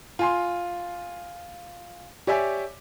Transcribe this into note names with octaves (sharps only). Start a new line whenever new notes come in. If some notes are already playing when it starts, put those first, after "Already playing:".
F4 G#5 C6
G4 C#5 D5 E5 G#5